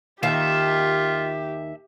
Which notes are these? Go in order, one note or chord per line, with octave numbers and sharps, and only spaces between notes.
D#2 D#3 F4 G4 E5 F5